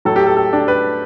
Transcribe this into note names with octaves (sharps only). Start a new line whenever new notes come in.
A2 F#3 A4
G4
A4
A4
D4
B4